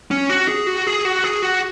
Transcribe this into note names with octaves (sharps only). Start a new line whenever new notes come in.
C#4
F#4
G#4
F#4
G#4
F#4
G#4
F#4